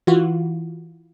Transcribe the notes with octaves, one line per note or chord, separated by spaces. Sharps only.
E3 F4 F#4